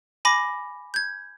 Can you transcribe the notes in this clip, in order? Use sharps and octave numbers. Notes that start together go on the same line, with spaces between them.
G#5 B5 D6 A#6
G6 G#6